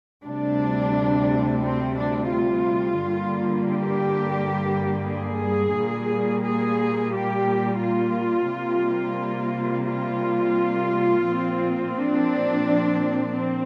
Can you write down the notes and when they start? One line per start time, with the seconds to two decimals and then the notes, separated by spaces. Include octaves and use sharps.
0.25 D2 C3 G3 D4
1.63 C4
1.97 D4
2.31 F4
3.01 G2 D3 G3 A#3
3.70 G4
5.07 G#4
5.76 A#2 G3 A#3
6.45 G#4
7.14 G4
7.82 F4
8.51 C3 G3 A#3
9.89 F4
11.27 A#2 F3 C4
11.96 D4
13.32 C4